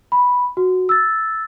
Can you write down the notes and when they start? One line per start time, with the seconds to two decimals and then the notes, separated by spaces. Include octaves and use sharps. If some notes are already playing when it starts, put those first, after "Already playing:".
0.12 B5
0.57 F#4
0.89 E6 A6